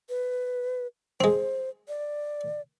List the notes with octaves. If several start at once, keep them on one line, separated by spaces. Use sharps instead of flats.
B4
G#3 C4 C5
D5